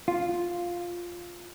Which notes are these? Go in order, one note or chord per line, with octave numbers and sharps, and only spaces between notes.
F4